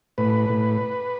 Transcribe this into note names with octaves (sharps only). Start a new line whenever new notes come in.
A2 B4
A2